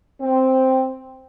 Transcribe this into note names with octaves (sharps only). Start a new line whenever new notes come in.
C4